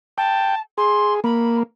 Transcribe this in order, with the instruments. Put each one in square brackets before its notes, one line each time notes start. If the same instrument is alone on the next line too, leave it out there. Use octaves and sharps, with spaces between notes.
[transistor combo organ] G5 [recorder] A5
[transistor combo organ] G#4 [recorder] C6
[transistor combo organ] A#3 [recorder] B5